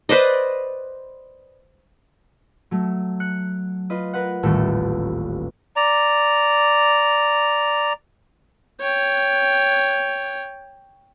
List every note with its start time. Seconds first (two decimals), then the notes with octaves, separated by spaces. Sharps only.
0.09 B4 C5 D5 D#5
2.71 F#3 A3
3.20 F#6 C#7
3.90 F4 B4 D#5
4.13 A#4 B4 F#5
4.43 D#1 A1 A3 A4
5.76 D5 A#5
8.81 C#5 G5